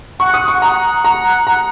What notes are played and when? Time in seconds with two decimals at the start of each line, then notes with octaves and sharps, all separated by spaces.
0.20 F#5 C#6
0.34 D#6
0.48 C#6
0.62 F#5 A#5
1.04 A#5
1.47 A#5